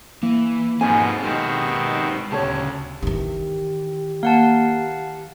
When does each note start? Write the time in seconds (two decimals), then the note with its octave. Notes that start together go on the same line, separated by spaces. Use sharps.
0.23 E3 A#3
0.81 G#2 B2 F3 C4 D#4 A4 G#5
1.23 B2 D#3 G#3 C4 D#4 G4 F6
2.32 D2 C#3 G4 C#5 A5
3.02 D#3 E3 G4
4.23 A#3 F5 F#5 A5